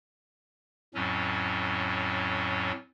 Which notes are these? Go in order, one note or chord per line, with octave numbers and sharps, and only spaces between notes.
F2 A2 F#3 C#4